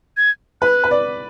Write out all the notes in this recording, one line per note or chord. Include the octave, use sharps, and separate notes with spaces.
G#6
B4 F#6
B4
D5